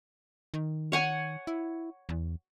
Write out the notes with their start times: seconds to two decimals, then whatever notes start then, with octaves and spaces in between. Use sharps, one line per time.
0.54 D#3
0.92 C#5 F#5 G#5
1.47 E4
2.09 E2